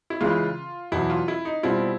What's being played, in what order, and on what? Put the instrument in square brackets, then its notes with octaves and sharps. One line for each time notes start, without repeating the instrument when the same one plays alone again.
[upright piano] E4
[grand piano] C#3 E3 G#3 [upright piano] F4
[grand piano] E2 B2 F#3 [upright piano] E4
[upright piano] F4
E4
D#4
[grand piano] B2 G3 C4 F4 [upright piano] E4